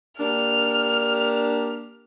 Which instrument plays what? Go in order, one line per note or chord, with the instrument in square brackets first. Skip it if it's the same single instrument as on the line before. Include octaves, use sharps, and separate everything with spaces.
[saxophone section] A#3 D4 G4 [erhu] F6